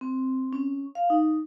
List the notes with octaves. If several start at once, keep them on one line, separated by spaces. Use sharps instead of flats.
C4
C#4
F5
D#4